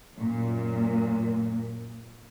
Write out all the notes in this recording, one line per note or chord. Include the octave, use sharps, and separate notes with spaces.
F#2 A#2